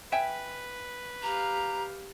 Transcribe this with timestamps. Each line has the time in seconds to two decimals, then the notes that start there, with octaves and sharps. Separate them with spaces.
0.12 B4 E5 G5 G#5
1.23 G4 F5 A#5